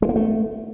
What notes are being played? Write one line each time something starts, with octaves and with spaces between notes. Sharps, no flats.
G#3
A#3
A3